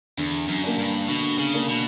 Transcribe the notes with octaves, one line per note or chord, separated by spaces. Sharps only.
E2 D3
F#2
A#3 D4
G2
B2 D3
C#3
A#3 D4
B2